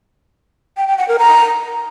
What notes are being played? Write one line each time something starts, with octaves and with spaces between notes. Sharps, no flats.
G5
G5
F#5
A#4
A#5